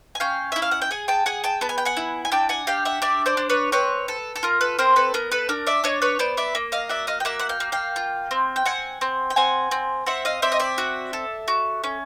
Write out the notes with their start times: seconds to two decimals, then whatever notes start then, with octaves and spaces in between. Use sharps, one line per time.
0.15 G#5
0.20 C#4 F5 G5
0.52 E4 E5
0.62 F5
0.71 F#5
0.82 G5
0.91 G#4 F#5 G#5
1.08 G5 A5
1.26 G#4 F#5 G#5
1.44 G5 A5
1.61 B3 A5
1.69 G#5
1.78 G5
1.85 F#5 G#5
1.97 E4
2.25 G#5
2.32 D4 G5 A5
2.49 F#5 G#5
2.67 G4 F5 G5
2.85 E5 F#5
3.02 D4 D5 E5
3.26 C5 D5
3.37 D4
3.50 B4 C#5
3.72 C4 B4 C#5
4.08 A4
4.36 A4
4.43 F4 A#4
4.61 A4 B4
4.79 C4 A#4 C5
4.96 A4 B4
5.14 B3 A#4
5.32 A4 B4
5.49 D4 A#4
5.67 D5 E5
5.84 D4 C#5 D#5
6.02 B4 C#5
6.19 B3 C5 D5
6.37 D5 E5
6.55 A#3
6.72 D#5 F5
6.89 F#4 D5 E5
7.07 D#5 F5
7.20 G5
7.25 A#3 E5 F#5
7.39 F#5
7.49 F5 G5
7.60 A#3
7.72 F5 G5
7.96 F4
8.31 C4
8.56 G5
8.65 C4 F#5 G#5
9.01 C4
9.30 G5
9.36 C4 F#5 G#5
9.71 C4
10.06 C4 E5 F#5
10.25 D#5 F5
10.42 C4 D5 E5
10.52 D#5
10.60 D5 E5
10.78 F#4
11.13 A4
11.48 F#4
11.84 C#4